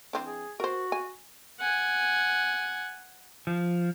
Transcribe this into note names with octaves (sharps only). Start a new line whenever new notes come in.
E3 C4 D4
G#4
F#4 A#4 C5
G#5
F#5 G#5
F3